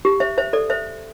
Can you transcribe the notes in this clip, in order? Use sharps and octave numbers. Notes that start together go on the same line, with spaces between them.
G4
C5 E5
C5 E5
A4 D5
C5 E5